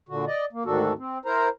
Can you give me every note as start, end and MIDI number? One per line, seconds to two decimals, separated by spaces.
0.09 0.25 46
0.09 0.25 50
0.09 0.25 66
0.27 0.45 74
0.27 0.45 75
0.53 0.63 58
0.65 0.93 38
0.65 0.93 44
0.65 0.93 51
0.65 0.93 62
0.65 0.93 66
0.65 0.93 69
0.98 1.18 60
1.25 1.49 64
1.25 1.49 70
1.25 1.49 72
1.25 1.49 82